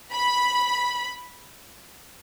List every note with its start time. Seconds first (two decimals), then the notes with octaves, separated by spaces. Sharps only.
0.13 B5